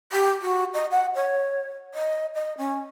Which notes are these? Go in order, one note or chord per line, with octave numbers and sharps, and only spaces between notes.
G4
F#4
D#5
F#5
C#5
D#5
D#5
C#4